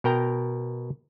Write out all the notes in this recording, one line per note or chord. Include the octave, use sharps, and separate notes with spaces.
B2 A#4 G5 A#5